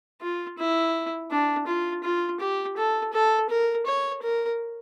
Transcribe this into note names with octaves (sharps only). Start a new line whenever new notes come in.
F4
E4
D4
F4
F4
G4
A4
A4
A#4
C#5
A#4